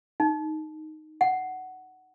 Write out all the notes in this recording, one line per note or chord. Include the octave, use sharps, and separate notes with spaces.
D#4
F#5